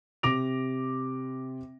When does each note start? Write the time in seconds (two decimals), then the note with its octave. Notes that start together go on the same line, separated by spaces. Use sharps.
0.23 C3 D6 A#6 D7 F7